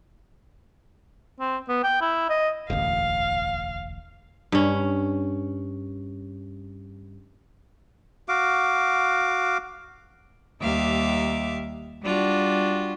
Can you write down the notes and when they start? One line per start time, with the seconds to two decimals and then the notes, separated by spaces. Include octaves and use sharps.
1.40 C4
1.69 B3
1.83 G5
2.01 E4
2.30 D#5
2.70 E1 A1 D2 F5
4.52 G2 C#4
8.28 F#4 F5 D6
10.61 D#2 G3 E5 F5 D6
12.03 G3 D4 F4 F#4